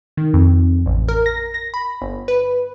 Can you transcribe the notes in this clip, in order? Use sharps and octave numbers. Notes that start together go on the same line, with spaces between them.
D#3
F2
A1
A#4
A#6
A#6
B5
G1
B4